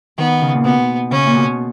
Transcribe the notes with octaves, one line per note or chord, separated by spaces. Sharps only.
D#3 B3
C#3
A#2
B2 B3
C#3 C#4
A#2
B2